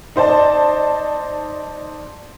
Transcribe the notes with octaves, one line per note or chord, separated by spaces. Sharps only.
D#4 C5 D5 A5